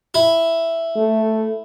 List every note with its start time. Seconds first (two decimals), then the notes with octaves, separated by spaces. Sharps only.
0.14 E4
0.96 A3